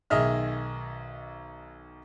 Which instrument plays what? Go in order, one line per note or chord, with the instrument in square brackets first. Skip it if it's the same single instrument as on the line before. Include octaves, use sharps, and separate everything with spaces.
[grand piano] B1 D#3 G#4 D#5 E5 F6